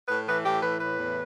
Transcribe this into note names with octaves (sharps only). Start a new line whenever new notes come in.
A2 B4
E3 B4
A2 G4
E3 B4
A2 B4
E2